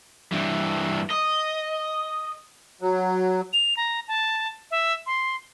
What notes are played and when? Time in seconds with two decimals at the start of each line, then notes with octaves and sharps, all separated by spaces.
0.32 G2 E3
1.11 D#5
2.81 F#3
3.53 F7
3.77 A#5
4.08 A5
4.71 E5
5.06 C6